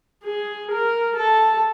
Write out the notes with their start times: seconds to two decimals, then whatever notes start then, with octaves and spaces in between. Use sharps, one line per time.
0.24 G#4
0.71 A#4
1.16 A4